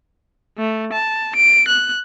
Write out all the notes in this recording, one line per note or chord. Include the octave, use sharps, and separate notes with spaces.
A3
A5
D7
F#6